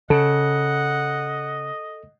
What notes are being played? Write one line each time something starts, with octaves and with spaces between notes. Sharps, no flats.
C#3 A4 D#5 F#5